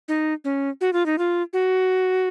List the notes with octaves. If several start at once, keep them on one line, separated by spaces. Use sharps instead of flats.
D#4
C#4
F#4
F4
D#4
F4
F#4